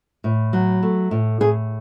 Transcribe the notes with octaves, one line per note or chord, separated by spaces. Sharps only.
A2
F#3
A3
A2
A2 G#4